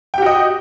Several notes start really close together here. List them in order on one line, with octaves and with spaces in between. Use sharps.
G5 G4 F#4 D#5